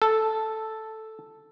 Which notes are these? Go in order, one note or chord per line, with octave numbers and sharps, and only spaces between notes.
A4